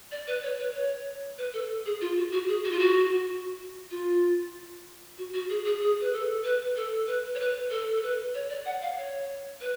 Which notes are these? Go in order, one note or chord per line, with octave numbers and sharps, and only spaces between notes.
D5
B4
C#5
B4
C#5
B4
A4
G#4
F4
F#4
F#4
G#4
F#4
F4
F#4
F4
F#4
F#4
G#4
G#4
G#4
B4
A4
B4
A4
B4
C#5
B4
A4
A4
B4
C#5
D5
F#5
F5
C#5
B4